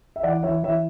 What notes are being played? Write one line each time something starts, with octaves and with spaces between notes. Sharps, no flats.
E5
E3 D5 F#5
E3 C#5 E5
E3 C#5 E5